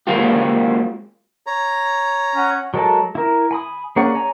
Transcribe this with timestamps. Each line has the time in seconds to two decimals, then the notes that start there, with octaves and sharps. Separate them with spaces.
0.07 F#3 G#3 A#3 C4 F4 G4
1.47 C#5 A#5
2.35 C#4 F#5
2.74 F#3 G#3 A4 A#4 A5
3.15 E4 A#4
3.51 G#5 B5 D#6
3.96 A#3 C#4 G#4 D5 F#5
4.15 C#5 G#5 A#5